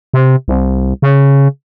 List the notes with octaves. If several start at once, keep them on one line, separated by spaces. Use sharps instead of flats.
C3
C2
C#3